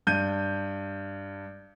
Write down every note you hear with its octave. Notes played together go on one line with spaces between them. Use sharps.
G2 G6 D#7